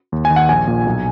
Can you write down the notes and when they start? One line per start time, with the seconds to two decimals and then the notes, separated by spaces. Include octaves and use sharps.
0.12 D#2
0.25 G#5
0.30 D#3
0.36 F#5
0.49 A#1 G#5
0.67 A#2
0.86 B1